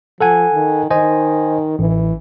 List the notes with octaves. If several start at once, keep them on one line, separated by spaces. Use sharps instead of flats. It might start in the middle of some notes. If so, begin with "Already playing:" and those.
F3 A4 F#5 G#5
D#3
D#3 C5 D#5 G#5
A1 E3